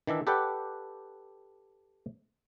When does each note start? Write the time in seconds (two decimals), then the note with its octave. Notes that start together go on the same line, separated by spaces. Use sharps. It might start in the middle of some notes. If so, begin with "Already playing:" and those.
0.07 D#3 E3 D4 E5
0.27 G4 A4 B4 D5 F#5 G5